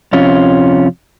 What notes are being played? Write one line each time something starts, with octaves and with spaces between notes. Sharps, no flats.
F2 C3 C#4 F4